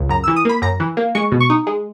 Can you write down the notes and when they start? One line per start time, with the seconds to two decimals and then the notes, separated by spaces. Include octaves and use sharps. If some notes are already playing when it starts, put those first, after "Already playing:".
Already playing: C#2
0.09 F#2 A#5
0.24 E6
0.27 E3
0.36 D#6
0.45 A#3 B5
0.62 F#2 A#5
0.80 E3
0.97 A#3
1.15 G#3 C#6
1.32 B2
1.40 C#6
1.50 D#4
1.67 G#3